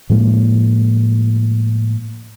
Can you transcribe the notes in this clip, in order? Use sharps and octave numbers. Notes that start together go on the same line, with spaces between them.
A2 F3 G#3 A#3